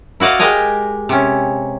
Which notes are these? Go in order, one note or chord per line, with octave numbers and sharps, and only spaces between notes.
E4 F#4 D5 D#5 F5
G#3 G4 A#4 D#5 G#5
C3 C#4